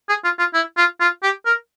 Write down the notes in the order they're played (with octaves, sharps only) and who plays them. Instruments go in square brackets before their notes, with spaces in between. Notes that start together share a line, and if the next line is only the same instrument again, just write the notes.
[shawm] G#4
F4
F4
E4
F4
F4
G4
A#4